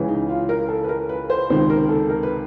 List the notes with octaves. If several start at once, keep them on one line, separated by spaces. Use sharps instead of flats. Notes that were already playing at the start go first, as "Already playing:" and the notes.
Already playing: C#2 C#3 E3
D#4
F4
A#4
A4
B4
A#4
B4
C5
C#2 C3 D#3 C5
A#4
A4
A#4
B4